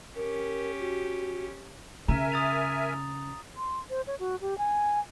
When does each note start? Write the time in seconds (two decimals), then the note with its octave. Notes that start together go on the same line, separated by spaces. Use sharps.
0.16 C#4 G4 A#4
0.80 F#4
2.08 C#3 A#4 E5 G#5 A#5
2.32 D#6 A6 F7
3.57 C6
3.90 C5
4.07 C#5
4.19 F#4
4.41 G4
4.58 G#5